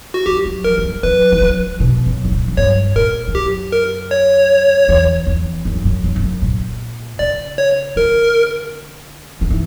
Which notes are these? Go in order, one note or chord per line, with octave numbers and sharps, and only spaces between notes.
F#4
F#3 G4
F#3
E3 A#4
F#3
G3
F#3 B4
E3
F#3
B2
F#2
B2
A#2
F#2
G2 C#5
A#2 A#4
E2
F#2 G4
A#4
C#5
E2
E2
F#2
G2
F#2
F#2
E2
F#2
A#2
C#3 D5
C#5
D3 A#4
D3
E3